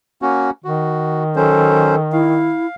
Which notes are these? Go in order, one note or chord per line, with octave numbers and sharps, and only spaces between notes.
A#3 C#4 F#4
D#3 F#4
F#3 C#4 A4 C5
E4 F5